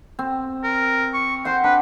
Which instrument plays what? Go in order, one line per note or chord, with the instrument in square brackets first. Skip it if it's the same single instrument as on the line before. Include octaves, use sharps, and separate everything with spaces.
[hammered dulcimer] C4
[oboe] A#4
C#6
[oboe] C5 [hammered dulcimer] F#5 C6
[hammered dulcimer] D4 [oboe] B4